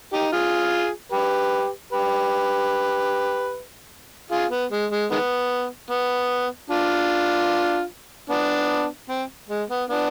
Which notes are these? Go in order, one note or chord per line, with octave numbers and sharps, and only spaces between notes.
D#4 G4
F4 G#4
G4 B4
G4 B4
F4 G#4
B3
G#3
G#3
D#3 G#3 B3
B3
D4 F4
B3 D4
C4
G#3
B3
B3 D4